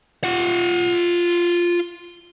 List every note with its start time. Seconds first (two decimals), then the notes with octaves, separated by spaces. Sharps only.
0.24 F4 F#5